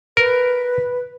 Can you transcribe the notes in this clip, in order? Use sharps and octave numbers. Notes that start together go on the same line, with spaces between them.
A#4 B4